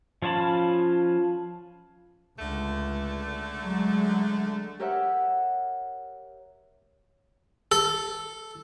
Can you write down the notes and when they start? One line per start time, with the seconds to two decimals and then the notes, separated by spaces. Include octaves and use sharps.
0.22 F3 C#4 F4 A5 B5
2.39 C#2 D3 A3
3.60 F#3 G#3
4.79 G4 A#4 C#5 E5 F#5
7.72 A4